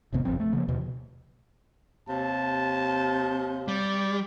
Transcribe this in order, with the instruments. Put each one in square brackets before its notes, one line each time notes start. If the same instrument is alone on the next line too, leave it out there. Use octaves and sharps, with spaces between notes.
[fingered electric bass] G#1 F2 C3 B3
G1 F2 F3 C4
A3
C#3 F3 A#3
D#2 B2
[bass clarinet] D#2 [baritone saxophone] C3 [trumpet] A5
[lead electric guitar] G3 [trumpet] D5